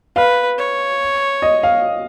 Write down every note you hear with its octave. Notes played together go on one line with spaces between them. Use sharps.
B4 F5
C#5
D#5
F5